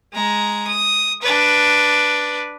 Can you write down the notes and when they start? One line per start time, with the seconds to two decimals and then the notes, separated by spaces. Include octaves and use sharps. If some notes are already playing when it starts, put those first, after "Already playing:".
0.13 G#3 A#5
0.68 D#6
1.22 D4 B4